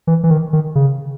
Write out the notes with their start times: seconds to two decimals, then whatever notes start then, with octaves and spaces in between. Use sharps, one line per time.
0.07 E3
0.24 E3
0.30 D#3
0.53 D#3
0.75 C#3